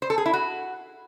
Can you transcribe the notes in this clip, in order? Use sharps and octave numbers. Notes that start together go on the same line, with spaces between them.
C5
A4
G#4
E4
F#4